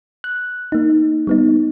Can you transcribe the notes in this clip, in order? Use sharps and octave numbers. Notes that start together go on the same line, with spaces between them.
F#6
A#3 D#4
G3 B3 D#4